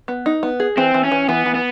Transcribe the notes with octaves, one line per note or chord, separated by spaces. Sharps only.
B3
D#4
B3
G#4
E3 C4
E3
C#4
E3
E3 B3
E3
B3